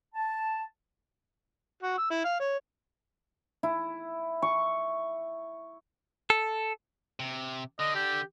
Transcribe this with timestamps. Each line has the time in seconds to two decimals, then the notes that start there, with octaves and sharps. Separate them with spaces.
0.15 A5
1.83 F#4
1.98 E6
2.11 E4
2.25 F5
2.40 C#5
3.63 E4
4.42 C#6
6.30 A4
7.20 C3
7.80 D3 D#5
7.95 G4